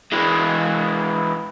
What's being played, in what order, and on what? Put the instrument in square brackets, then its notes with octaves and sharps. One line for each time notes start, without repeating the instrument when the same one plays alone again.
[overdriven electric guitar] E3 G#3